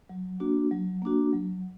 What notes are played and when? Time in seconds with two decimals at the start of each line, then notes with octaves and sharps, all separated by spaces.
0.09 F#3
0.40 A#3 D4 F#4
0.71 F#3
1.02 A#3 D4 F#4
1.33 F#3